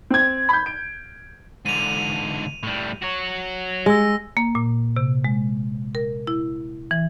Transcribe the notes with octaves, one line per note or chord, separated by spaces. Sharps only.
C4 G#6
B5 G6
D7
G#2 D3 D#7 F7
A2 G3
F#4 C#5
G#3 E6 A#6
A#3
A#2
C3
G#3
A#4
E4
E3